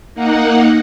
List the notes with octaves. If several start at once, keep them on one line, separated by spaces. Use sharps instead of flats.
A#3 D#4 F#5